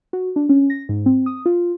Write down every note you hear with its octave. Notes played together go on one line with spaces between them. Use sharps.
F#4
D4
C#4
A#6
G#2
C4
D#6
F4